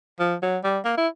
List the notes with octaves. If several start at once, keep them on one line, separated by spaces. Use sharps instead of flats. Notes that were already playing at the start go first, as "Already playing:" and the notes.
F3
F#3
G3
A#3
E4